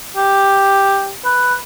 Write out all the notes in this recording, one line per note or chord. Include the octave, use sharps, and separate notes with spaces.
G4
B4